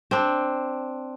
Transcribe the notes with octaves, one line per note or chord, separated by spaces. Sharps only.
C4 D4